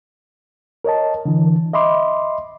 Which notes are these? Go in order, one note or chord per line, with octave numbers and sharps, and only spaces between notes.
A#4 C#5 D#5 A5
D3 E3
D#5 E5 B5 C6 D6